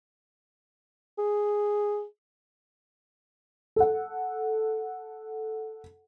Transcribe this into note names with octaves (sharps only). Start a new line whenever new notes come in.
G#4
A4 F#5